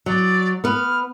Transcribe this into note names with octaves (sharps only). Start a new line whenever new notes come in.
F#3 D5
B3 B4 F6